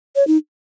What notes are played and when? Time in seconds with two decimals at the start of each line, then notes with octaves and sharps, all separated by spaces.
0.16 C#5
0.27 D#4